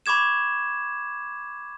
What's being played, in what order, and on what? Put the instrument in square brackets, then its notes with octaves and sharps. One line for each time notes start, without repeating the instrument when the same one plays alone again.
[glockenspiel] B5 C#6 D6 G#6 E7